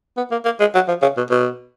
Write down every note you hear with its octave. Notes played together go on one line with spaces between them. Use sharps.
B3
A#3
A#3
G#3
F#3
F3
C#3
B2
B2